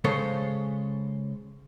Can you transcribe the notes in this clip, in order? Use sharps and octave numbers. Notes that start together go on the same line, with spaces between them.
C#3 G#3 A4 C5 C#5